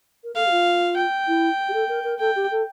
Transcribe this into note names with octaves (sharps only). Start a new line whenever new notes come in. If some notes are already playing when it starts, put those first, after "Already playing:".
A#4
A4 F5
G4
F4
G5
E4
G4
A4
A#4
A#4
A4 G5
G4
A4